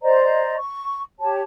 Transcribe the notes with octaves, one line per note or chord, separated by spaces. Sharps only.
C5 D5 D#5 A#5
C#6
G4 C#5 A5